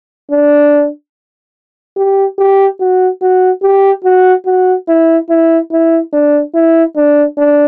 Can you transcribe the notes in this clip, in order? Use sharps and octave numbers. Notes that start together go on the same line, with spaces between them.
D4
G4
G4
F#4
F#4
G4
F#4
F#4
E4
E4
E4
D4
E4
D4
D4